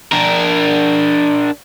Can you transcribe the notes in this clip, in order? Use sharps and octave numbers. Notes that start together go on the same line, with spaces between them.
D4 A#4